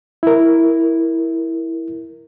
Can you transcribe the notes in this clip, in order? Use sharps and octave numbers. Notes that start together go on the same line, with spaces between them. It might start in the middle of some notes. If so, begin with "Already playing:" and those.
E4 A#4